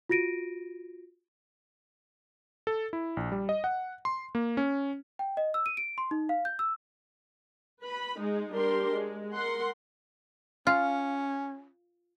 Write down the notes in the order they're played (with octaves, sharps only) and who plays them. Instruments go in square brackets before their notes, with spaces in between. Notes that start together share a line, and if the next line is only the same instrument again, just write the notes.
[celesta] F4 F#4 A#6 D7 D#7
[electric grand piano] A4
E4
A#1
G3
D#5
F#5
C6
A#3
C#4
[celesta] G5
D#5
E6
D#7
D7
C6
D#4
F5
G6
E6
[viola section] B4 B5
G#3 D#4
G3 D4 G4 A#4 C6
G#3
A#4 F#5 C6
[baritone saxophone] C#4 [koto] F4